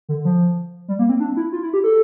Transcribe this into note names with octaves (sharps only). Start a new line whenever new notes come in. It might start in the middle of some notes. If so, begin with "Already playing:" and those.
D3
F3
G3
A#3
C4
D4
E4
F4
E4
G4
A4